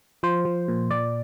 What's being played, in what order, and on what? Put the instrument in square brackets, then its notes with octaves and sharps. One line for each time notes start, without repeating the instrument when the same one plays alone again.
[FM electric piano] F3 C5
F3
A#2
A#2 D5